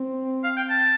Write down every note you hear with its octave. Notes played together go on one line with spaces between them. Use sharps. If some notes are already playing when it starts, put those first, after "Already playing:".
Already playing: C4
F5
G5
A5